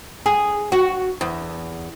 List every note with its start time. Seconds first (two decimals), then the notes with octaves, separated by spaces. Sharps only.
0.26 G#4
0.72 F#4
1.21 E2